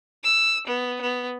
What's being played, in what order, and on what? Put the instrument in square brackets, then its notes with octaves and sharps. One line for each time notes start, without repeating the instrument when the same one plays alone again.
[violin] E6
B3
B3